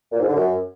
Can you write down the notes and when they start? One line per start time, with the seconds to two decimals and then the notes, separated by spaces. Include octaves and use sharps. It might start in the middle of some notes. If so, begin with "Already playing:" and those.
0.12 A#2
0.20 G#2
0.28 D3
0.35 F#2